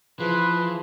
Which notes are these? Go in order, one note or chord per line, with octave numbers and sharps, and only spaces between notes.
E3 F3 G#4 B4 C6